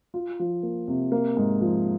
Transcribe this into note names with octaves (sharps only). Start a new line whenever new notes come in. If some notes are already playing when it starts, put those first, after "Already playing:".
F4
F3
A#3
C3
A#3
G#2
F3